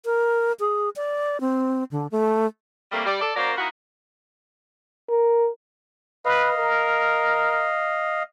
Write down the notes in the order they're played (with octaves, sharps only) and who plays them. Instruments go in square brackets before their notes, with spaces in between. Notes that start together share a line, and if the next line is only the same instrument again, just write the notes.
[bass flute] A#4
G#4
D5
C4
D3
A3
[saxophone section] C3 G3 A3 A#3
G3 D5
A4 D5
F#3 A#3 C#4 A#4 C5 D5
A#3 D#4 E4 F#4
[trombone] A#4
[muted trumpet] B4 [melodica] D#5 F5
[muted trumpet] A#4